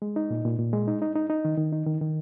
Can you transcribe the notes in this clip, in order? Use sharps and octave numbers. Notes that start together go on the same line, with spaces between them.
G#3
D#4
A#2
A#2
A#2
G#3
D#4
D#4
D#4
D#4
D#3
D#3
D#4
D#3
D#3